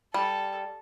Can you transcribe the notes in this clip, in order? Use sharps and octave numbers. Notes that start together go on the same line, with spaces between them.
G3 A4